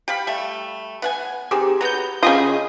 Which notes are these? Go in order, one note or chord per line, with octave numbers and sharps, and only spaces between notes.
G4 F5 B5
G3 A3
B3 F#5 G#5
D#3 C4 G4 G#4
F#3 B3 A#5 G6
C#3 F4 G4 G#4 D#5 D#6 G6